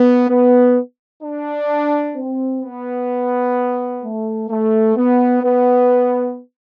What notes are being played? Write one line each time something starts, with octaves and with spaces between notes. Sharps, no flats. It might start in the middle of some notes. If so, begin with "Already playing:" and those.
Already playing: B3
B3
D4
C4
B3
A3
A3
B3
B3